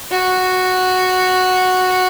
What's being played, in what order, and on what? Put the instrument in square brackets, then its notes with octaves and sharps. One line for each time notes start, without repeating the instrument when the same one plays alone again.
[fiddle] F#4